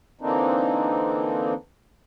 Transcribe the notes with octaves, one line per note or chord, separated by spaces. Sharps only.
D3 E3 A#3 C4 D4 D#4